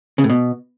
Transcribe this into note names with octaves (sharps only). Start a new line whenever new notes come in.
C#3
A2
B2